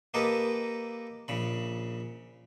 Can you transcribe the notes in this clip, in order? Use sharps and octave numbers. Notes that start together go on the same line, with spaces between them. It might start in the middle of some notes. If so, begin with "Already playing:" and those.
A#3 G4 A4 B4 D#5
A#1 C#3 B5